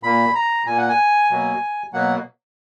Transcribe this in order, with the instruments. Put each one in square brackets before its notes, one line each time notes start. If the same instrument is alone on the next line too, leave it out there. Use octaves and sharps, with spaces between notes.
[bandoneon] A#2 A#3 B5
A#5
A#2 A#3 G#5
F#5
G#5
B2 F#3 A#3
B2 F#3 A#3 F#5